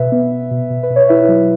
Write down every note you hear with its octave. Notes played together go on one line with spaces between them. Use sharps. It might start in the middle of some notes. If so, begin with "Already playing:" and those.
Already playing: B2 B4 E5
B3
B3
B2
B2
B4
B2
C#5
E4 B4 E5
F#3